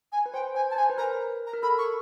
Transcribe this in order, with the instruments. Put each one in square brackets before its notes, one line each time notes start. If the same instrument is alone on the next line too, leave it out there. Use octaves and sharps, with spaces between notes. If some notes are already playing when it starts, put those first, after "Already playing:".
[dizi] G#5
[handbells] B4
[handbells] C5 [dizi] G5
[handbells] C5 [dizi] G#5
[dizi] A5
[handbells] C5 [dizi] G#5
[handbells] B4
[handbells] A#4 [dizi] A#5
[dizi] A#5
[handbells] A#4
[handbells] A4 [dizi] B5
[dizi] C#6